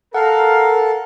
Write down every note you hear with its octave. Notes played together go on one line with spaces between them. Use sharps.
A4 A#4 F5 F#5